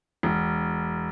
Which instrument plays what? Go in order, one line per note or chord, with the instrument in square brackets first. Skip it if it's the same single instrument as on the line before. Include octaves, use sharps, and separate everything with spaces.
[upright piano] E1